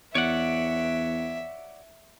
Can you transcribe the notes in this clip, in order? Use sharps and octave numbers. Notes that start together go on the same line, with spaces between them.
E2 C#5 D5 E5 F#5